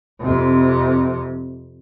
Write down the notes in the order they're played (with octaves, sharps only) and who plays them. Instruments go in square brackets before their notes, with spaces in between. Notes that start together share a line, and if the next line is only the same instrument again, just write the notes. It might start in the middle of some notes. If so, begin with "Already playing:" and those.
[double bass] F2 C3